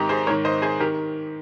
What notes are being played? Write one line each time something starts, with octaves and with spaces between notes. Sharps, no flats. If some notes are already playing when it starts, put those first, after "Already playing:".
Already playing: G#2 D#3 D#4 G4
G#4 C5
G#2 D#3 A#4 C#5
C5 D#5
G#4 C5
D#3 G4 A#4